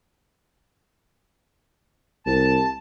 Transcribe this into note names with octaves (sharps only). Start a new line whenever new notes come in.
C2 A5